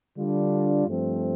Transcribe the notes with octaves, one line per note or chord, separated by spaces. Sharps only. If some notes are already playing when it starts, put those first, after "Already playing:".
D3 G3 D4 F4
G2 F3 A3 C4